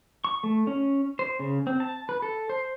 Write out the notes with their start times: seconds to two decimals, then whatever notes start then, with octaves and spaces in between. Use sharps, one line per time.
0.24 C#6
0.44 A3
0.67 C#4
1.19 C5
1.40 C#3
1.67 C4
1.80 A5
2.09 B4
2.22 A4
2.49 C5